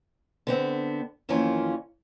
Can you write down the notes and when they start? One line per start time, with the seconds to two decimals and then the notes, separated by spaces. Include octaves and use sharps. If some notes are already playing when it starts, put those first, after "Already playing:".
0.47 D3 B3 C4
1.29 F2 D#3 E3 A#3 C#4 F4